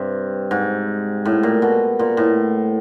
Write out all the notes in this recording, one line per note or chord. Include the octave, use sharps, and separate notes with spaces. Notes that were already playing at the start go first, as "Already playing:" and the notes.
Already playing: G2 C3
G#2
A2
A#2
B2
A#2
A2